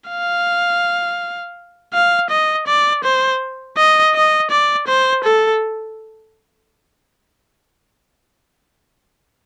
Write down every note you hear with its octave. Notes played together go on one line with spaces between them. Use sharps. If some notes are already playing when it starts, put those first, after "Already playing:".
F5
F5
D#5
D5
C5
D#5
D#5
D5
C5
A4